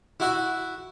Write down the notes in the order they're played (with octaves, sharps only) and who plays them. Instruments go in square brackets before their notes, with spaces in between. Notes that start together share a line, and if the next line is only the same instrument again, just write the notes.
[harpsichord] E4 F#4 E5